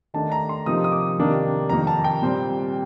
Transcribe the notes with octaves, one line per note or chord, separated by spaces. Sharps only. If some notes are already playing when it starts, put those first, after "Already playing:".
D#3 A3 D4 A5
A#5
C6
C3 F3 A#3 D#4 D#6
D#6
D6
C3 D#3 A#3 D4
F2 D#3 A#3 D#4 A#5
A5
G5
A#2 G3 C4